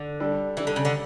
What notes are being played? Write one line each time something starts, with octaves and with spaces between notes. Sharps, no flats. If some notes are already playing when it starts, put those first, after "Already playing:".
Already playing: D3
G3 D4 A4
E3 G3 D4 A4
D3
C#3
D3